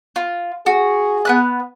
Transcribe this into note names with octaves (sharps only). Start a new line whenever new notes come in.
F4
F#4 G#4
B3 B4 F#6